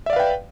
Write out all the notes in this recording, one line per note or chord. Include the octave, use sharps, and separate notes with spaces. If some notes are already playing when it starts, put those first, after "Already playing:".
B4 D5 E5 F5 G5